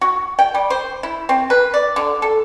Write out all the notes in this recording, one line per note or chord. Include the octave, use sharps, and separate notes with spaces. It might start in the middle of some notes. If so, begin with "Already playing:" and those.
F#4
G5
G3
C5
E4
C4
B4
D5
D3
A4